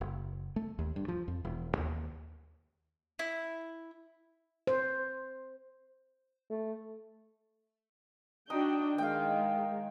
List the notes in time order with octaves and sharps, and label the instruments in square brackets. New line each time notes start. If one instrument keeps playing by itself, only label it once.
[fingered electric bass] F#1
A3
D#2
G2
F3
F2
E1
D#2
[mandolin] E4
[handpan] C5
[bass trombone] A3
[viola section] D4 F#4 G5 [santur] D#4
[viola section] D#3 G#3 [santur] F5 G5